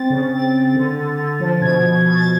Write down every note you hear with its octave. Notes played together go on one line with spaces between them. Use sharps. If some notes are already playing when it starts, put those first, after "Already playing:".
Already playing: C4 A6
C#3
C4 A6
C4
D3
D3
D3
F3
B2 G#6
B2
B2 G#6
A6